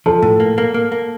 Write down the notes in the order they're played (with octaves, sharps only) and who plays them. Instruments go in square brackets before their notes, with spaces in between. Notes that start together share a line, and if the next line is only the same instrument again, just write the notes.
[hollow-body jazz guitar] F3 [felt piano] A4
[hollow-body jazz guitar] A2
A#3
A#3
A#3
A#3